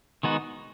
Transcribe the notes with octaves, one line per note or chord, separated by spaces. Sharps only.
D#3 G#3 B3 D#4 F#4